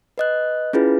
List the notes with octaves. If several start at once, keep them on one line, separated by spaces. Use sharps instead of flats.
B4 D#5 F#6
C#4 E4 F4 G#4 B4